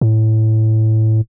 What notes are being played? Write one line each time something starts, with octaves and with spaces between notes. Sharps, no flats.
A2